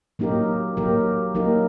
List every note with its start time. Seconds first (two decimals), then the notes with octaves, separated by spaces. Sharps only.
0.19 F#3 A#3 D#4 G4 A#4
0.77 F#3 A#3 D#4 G4 A#4
1.35 F#3 A#3 D#4 G4 A#4